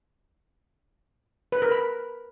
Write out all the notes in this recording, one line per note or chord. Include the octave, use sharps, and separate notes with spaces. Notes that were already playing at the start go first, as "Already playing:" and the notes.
B4
A#4
B5